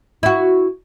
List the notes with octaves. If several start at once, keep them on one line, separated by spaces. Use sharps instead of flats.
E4 F#4